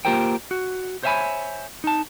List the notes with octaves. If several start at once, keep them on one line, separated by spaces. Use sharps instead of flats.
A#3 F4 G4 A#4 C5 G5
F#4
C5 C#5 E5 F#5 G#5 B5
D#4 A5